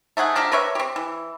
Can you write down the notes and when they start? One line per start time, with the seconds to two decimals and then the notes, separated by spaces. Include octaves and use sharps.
0.17 A3 D#4 G#4 F#5
0.35 F3 D4 G4 A#4
0.52 A#4 B4 C#5 E5
0.75 C4 G4
0.96 E3